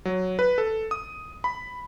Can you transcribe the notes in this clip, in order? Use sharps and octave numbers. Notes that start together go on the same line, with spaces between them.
F#3
B4
A4
D#6
B5